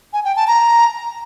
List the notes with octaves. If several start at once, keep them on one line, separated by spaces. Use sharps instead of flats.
G#5
G5
A5
A#5